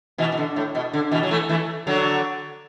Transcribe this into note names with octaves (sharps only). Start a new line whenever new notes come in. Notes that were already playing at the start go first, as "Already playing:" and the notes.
B2 E3
B2
D3
A2
B2
D3
B2 E3
F#3
E3 A3
E3 A3
D3 F#3